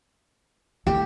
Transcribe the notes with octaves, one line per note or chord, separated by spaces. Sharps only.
F#3 A3 G4